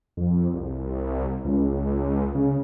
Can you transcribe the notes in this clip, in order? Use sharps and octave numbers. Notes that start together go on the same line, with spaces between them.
F2
C2
C#2
C#3